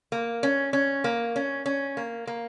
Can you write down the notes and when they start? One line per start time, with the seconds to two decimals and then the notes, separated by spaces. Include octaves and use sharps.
0.12 A#3
0.43 C#4
0.73 C#4
1.04 A#3
1.36 C#4
1.66 C#4
1.97 A#3
2.27 A#3